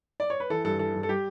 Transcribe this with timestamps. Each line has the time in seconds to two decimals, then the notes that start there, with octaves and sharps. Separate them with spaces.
0.20 D5
0.30 C#5
0.40 B4
0.50 E3 A4
0.65 G2 A4
0.79 E3 A4
0.94 G2
1.03 A4
1.09 G3 G4